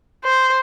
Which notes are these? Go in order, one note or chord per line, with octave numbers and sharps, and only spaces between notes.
C5